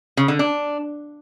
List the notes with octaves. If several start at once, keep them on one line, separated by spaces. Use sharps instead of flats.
C#3
D3
D4